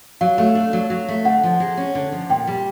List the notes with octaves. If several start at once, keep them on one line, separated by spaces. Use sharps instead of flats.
F#3 F5
A3
D4
F#3
F#3
A3
D3 F#5
F3
G#3
C#4
D3
F3
A#2 G5
G3